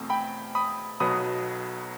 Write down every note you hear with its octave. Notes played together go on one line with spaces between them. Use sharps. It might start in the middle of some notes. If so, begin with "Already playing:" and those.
Already playing: E2 B2 A3 C4
G5 B5
B5 D#6
B1 B2 F#3 B3 B5 D#6